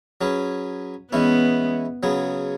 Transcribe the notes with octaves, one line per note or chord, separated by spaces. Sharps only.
F#3 C#4 G#4 B4
E3 G#3 B3 C#4 E4
C#3 F#3 B3 G#4